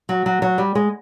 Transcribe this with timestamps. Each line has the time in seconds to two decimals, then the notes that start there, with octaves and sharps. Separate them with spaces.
0.09 F#3
0.26 F#3
0.42 F#3
0.58 G3
0.75 G#3